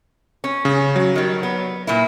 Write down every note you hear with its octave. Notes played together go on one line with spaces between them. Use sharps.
C#4
C#3
F#3
D#3 G3
B3
A#2 A#3 E4